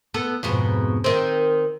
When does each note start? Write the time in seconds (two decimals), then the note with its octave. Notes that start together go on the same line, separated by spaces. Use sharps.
0.14 B3 A4
0.43 F2 G#2 B2
1.04 D#3 C4